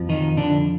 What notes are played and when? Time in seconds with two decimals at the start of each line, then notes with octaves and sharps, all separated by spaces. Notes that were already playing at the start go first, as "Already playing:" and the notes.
Already playing: F2 F3
0.09 D#3 D#4
0.37 D3 D4